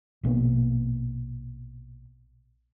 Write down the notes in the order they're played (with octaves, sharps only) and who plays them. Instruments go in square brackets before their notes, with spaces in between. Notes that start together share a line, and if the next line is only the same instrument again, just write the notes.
[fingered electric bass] A#1 B2 A#3 B3